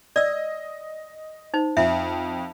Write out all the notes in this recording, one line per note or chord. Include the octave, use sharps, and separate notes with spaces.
D5 D#5 E6
D#4 C5
F2 E5